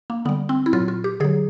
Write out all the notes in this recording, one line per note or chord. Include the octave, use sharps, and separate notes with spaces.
A#3
D3 G3 B3
C4
E4
A#2 F#3 F4
F4
G4
D3 F#3 G#4